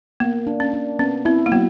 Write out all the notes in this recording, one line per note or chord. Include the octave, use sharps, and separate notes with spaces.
A#3 B3
D4
C#4
D4
B3 C#4
C4 E4
A#3
F#3 B3